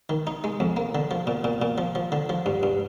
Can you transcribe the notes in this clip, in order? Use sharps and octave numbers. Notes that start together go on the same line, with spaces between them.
D#3
D#4
G#3
F2
A#3
D3
F3
A#2
A#2
A#2
F3
F3
D3
F3
G2
G2